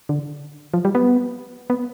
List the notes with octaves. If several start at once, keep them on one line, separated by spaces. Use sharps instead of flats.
D3
F3
G3
B3
B3